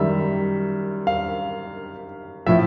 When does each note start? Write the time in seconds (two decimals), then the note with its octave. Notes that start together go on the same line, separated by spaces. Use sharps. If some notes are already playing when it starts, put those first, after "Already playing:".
Already playing: F#2 D#3 G3 E5
1.07 F5
2.46 A2 F3 E5